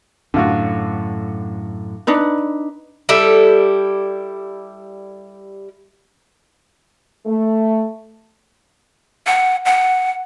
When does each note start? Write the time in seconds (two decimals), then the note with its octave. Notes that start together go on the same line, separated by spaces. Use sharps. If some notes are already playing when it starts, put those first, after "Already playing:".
0.34 F#2 A2 D3 F4 F#4
2.07 D4 D#4 B4
3.09 G3 E4 G4 A4
7.26 A3
9.27 F#5
9.65 F#5